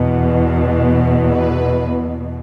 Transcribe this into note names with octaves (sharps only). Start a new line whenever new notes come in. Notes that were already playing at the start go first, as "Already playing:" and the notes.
Already playing: E2 B2
B4